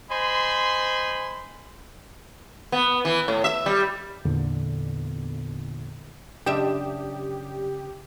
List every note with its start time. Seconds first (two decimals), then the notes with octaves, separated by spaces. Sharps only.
0.11 C5 D#5 G#5 B5 C6
2.72 B3
3.05 E3
3.28 A2
3.44 E5
3.66 G3
4.25 E2 A#2 D3
6.46 F#2 C#3 D4 G4 E5 D#6